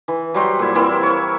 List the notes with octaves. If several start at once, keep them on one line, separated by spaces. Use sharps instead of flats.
E3
F#3 G3 C5 F#5
A#2 E4
E3 A#3 C4 E4
C#5